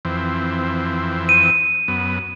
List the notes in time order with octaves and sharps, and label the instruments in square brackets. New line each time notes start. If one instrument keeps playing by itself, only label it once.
[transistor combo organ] F2 E3 C4
[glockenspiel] D#7
[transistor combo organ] F#2 B3